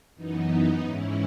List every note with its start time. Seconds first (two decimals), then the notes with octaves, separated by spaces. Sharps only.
0.15 F#2 E3 B3 D#4
0.82 G#2 E3 C#4 E4